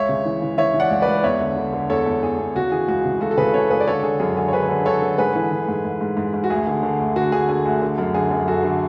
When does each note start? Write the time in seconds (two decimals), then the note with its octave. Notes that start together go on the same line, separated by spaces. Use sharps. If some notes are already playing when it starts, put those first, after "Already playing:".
Already playing: C#2 C#5 E5
0.09 C#3
0.25 E3
0.42 E3
0.58 E3 C#5 E5
0.74 E3
0.80 D5 F#5
0.90 C#2
1.02 B4 D5
1.07 C#2
1.24 E2 C#5 E5
1.40 D3
1.57 D3
1.73 D3
1.90 E2 A4 C#5
2.06 E2
2.23 E2 G#4
2.39 E2
2.55 C#3 F#4
2.72 E3 G#4
2.88 C#2 F#4
3.05 C#3
3.21 C#2 F#4 A4
3.31 A4
3.37 C#3 G#4 B4
3.54 C#3 A4 C#5
3.70 C#2 G#4 B4
3.80 D5
3.87 D3 A4 C#5
4.03 D3 G#4
4.20 F#2 G#4
4.36 D3 G#4
4.48 C#5
4.53 D3 G#4 B4
4.69 D3
4.86 D3 A4 C#5
5.02 D3
5.18 G#2 G#4 B4
5.35 E3
5.52 E3
5.68 G#2
5.85 G#2
6.01 G#2
6.17 G#2
6.34 G#2
6.44 F#4
6.50 D2 G#4
6.67 D3
6.83 D3
7.00 D2
7.16 D3 F#4
7.32 D3 G#4
7.49 D3 G#4
7.65 D2 F#4
7.82 D3
7.98 F#2
8.14 D3 G#4
8.31 F#2
8.47 F#2 F#4 A4
8.64 D3